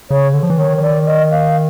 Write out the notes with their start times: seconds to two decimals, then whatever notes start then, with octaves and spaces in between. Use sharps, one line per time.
0.10 C#3 C#5
0.34 D3
0.43 F3
0.50 E3
0.58 D#3 C#5
0.77 C#5
0.82 D5
1.06 D#5
1.31 F5